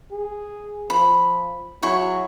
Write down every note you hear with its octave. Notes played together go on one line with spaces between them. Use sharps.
G#4
F3 B5
F#3 E4 G#4 C#6